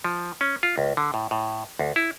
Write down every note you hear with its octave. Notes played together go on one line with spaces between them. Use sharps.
F3
C#4
F4
C#2
D3
A2
A2
D2
E4